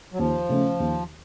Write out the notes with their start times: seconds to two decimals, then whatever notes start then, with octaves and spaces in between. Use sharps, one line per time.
0.13 F#3
0.19 D#2 F3
0.49 C#3 A3 C#4
0.80 D#2